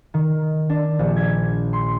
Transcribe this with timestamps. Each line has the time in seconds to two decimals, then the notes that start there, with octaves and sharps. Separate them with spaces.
0.14 D#3
0.70 D4
0.99 A#1
1.16 G#6
1.73 C6